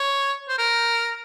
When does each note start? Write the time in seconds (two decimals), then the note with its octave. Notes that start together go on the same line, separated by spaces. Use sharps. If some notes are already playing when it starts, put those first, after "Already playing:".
Already playing: C#5
0.49 C5
0.58 A#4